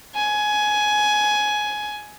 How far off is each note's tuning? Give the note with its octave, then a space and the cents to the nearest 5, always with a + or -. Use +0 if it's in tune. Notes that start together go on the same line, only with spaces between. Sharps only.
G#5 +15